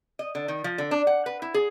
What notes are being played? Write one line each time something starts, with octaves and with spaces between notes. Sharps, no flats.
D#5
D3
D#3
F3
D3
D4
F#5
B4
E4
G#4